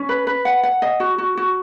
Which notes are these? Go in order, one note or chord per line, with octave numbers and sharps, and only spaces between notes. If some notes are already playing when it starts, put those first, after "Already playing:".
Already playing: C#4
B4
B4
F#5
F#5
D#5
F#4
F#4
F#4